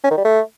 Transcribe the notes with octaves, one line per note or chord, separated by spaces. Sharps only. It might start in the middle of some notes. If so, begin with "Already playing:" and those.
C#4
D#3
G3
A3